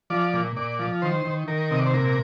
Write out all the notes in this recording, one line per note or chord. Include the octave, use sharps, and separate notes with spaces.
F3 D5
A#2
A#2 D5
F3
D#3 C5
D#3
D#3 A#4
C3 D#5
D5
C5
A#2 A#4